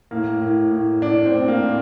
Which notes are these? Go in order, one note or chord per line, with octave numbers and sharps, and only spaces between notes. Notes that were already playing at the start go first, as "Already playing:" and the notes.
A2 A#3
A2
A2
A2 D4
C4
A2
A#3
A2